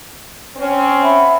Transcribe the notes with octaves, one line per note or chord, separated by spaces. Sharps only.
C4 C#4
E5 F#5 B5